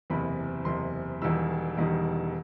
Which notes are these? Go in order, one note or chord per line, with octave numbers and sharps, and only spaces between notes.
F#1 E2 C3 B5
F#1 E2 C3 C6
E1 E2 D#3 G3 E6
E1 E2 D#3 G3